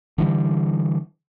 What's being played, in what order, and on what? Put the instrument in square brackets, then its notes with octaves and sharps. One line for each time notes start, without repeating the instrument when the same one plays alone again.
[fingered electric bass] D3 E3 G3